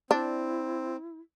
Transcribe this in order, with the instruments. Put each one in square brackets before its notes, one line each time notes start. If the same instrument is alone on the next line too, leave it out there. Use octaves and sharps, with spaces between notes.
[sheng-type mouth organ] C4 [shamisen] D4 [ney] E4